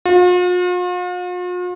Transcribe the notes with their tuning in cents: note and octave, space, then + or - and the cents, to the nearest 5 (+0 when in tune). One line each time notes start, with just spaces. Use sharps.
F4 +45